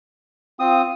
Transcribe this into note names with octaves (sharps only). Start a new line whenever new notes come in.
C4 F4 D#6